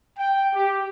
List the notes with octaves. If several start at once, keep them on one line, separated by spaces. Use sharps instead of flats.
G5
G4